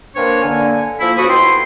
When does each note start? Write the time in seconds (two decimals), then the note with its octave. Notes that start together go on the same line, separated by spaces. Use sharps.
0.16 A#3 C4 D4 B4 C#5
0.42 D3 A#3 G#5
1.00 F3 A#3 E4
1.18 C#2 F3 F#4 A4 B5 D#6
1.30 F2 B2 E4 G5 C6